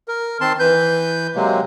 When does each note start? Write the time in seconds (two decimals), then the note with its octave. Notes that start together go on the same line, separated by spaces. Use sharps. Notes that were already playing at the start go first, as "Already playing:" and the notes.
0.08 A#4
0.41 D#3 C4 A5 C6
0.59 E3 B4 G6
1.35 C3 F#3 G#3 A#3